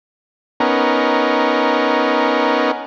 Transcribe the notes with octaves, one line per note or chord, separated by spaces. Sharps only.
B3 C#4 D#4 A#4